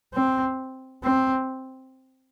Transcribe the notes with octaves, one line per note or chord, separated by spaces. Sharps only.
C4
C4